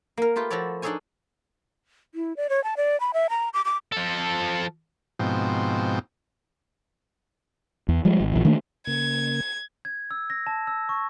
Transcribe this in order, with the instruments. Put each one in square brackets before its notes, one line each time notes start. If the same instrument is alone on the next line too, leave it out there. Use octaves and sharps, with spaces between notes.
[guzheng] A#3 A#4
A3 F4 G4 B4
F3 F#4 A4 C#5 D5
D4 D#4 G#4 A4 C#5 G#5
[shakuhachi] E4
D5
C#5
A5
D5
B5
E5
A#5
D6
D6
[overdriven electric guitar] F3 A4
[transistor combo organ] G#2 B2 F3 C4
[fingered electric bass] E2
F3 G3 G#3
G#1
A#1 E3
D#3 A3 A#3 D4
[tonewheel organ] C#3 A#3 [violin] G#6
[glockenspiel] G#6
E6
A#6
A5
E6
C#6